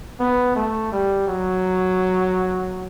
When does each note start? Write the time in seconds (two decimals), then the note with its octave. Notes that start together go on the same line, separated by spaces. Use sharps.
0.20 B3
0.56 A3
0.92 G3
1.28 F#3